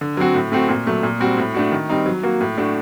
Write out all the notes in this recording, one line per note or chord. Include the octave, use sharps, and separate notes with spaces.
D3
F#3 C4 F#4
A2
A3 C4 F#4
A#2
F#3 A3
A#2
G3 C4 F#4
A2
A3 D4 F#4
D#3
G3 C4 D#4
F#3
A#3 F#4
A2
A3 D4 F#4